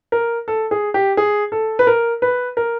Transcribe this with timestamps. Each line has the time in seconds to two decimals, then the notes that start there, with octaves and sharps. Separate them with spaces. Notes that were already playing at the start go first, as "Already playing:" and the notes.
0.12 A#4
0.48 A4
0.71 G#4
0.94 G4
1.17 G#4
1.52 A4
1.79 B4
1.87 A#4
2.22 B4
2.57 A#4